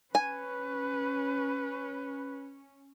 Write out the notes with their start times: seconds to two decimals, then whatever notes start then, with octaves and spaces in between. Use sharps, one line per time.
0.15 C#4 B4 G#5